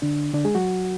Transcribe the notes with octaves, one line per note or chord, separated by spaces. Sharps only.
D3 D4
D3 D4
G#3 G#4
F#3 F#4